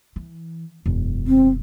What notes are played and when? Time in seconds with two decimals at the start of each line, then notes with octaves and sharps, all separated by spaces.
0.16 E3
0.86 E1 F#2
1.27 C4